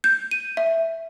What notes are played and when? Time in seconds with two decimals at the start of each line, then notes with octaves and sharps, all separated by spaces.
0.04 G6
0.31 D#7
0.57 E5